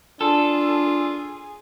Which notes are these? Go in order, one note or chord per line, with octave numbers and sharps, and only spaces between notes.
D4 F4 G#4 A4